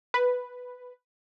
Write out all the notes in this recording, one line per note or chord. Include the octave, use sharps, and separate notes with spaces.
B4